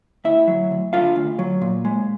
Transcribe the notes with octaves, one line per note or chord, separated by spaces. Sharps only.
D2 E4 E5
F#3
D2
D3 F4 F5
D2
F#3
A#2
G#3